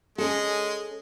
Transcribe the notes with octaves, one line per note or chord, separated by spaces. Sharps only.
G#3 C#4 A4